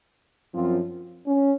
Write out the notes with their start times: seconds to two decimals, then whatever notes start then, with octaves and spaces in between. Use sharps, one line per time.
0.54 F#2 F3 C4 F4
1.27 C#4